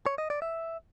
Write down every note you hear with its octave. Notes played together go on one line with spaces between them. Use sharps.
C#5
D#5
D5
E5